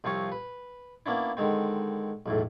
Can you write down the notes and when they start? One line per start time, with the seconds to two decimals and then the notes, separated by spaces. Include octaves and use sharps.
0.04 C2 F3 C4 F4 C#5
0.32 B4
1.06 A#3 B3 C#4 D4 E4
1.37 D3 D#3 G#3 C4
2.26 B1 E2 A2